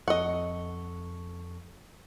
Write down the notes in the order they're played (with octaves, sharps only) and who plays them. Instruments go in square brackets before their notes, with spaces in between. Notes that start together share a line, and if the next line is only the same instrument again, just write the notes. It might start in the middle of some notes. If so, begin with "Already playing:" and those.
[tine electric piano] F2 A4 C#6 [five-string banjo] D#5 F#5